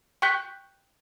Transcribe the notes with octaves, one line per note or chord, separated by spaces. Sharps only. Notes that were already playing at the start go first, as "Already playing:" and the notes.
G5 C#6 F#6 G6 B6